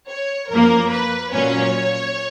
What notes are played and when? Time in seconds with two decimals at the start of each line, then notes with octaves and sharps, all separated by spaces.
0.09 C#5
0.50 F#2 F3 A#3 A#4
0.91 B4
1.33 A#2 F#3 C#4 C#5